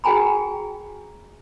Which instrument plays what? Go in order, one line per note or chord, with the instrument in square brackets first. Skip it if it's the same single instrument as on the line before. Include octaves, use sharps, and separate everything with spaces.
[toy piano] F#4 G#4 G5 G#5 A#5 B5